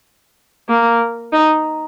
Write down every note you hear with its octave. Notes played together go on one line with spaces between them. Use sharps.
A#3
D#4